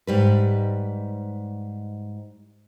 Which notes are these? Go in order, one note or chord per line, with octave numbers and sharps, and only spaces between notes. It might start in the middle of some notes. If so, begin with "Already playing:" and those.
G#2 G3 B4